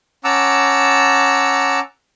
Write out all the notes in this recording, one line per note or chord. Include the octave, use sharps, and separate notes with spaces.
C#4 F#5 A5 A#5 D6 E6